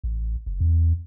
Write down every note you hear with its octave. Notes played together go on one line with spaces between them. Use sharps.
A1
F#1
E2